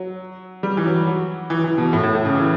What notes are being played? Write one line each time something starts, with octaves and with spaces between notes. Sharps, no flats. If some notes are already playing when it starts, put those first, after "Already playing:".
Already playing: F#3
G3
E3
F#3
F#3
E3
E3
B2
A2
A2
A2
C#3
E3